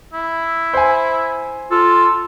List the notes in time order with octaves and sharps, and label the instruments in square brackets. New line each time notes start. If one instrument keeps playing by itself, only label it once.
[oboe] E4
[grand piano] C5 G#5
[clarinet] F4 [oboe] A4